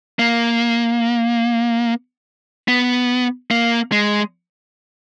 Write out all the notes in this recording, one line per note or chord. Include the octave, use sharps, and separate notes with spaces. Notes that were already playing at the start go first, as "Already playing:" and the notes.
A#3
B3
A#3
G#3